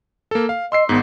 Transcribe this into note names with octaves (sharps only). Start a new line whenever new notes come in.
A#3 A4
F5
D#5 C6 E6 C7
G#1 G#2 B3